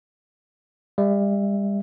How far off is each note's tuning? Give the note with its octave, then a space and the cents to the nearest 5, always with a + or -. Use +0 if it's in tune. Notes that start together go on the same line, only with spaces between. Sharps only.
G3 +35 E5 +15